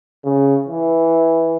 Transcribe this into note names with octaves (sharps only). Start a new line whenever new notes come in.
C#3
E3